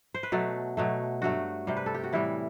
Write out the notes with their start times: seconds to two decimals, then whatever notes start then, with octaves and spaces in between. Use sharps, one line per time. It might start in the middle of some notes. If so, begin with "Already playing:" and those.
0.14 C5
0.23 B4
0.32 B2 F#3 A3 A4
0.77 B2 F#3 A3
1.22 G2 F#3 A3 F#4
1.67 C3 G3
1.77 B4
1.86 A4
1.94 G4
2.04 F#4
2.13 A2 E3 G3 E4